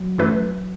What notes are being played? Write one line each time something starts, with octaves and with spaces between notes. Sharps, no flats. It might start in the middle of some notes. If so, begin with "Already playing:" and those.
Already playing: F#3
F#2 E3 A3 E4 B4